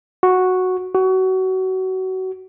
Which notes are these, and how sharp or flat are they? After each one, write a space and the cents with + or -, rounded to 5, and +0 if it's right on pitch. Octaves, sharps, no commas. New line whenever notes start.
F#4 -5
F#4 +25